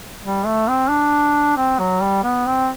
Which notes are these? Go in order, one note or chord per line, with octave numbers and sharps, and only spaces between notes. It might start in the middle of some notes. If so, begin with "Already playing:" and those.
G3
A3
C4
D4
C4
F#3
G3
B3
C4